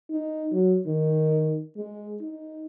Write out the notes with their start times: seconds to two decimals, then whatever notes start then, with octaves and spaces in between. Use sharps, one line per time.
0.10 D#4
0.52 F#3
0.87 D#3
1.77 G#3
2.21 D#4